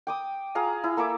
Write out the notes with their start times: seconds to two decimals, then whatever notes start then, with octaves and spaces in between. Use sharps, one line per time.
0.07 G5 D6 D#6
0.55 F4 G#4 F5 A#5
0.84 E4
0.97 A#3 A4 E5 D6